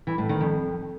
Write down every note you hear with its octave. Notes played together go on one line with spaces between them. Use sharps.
E3
A2
D#3
F2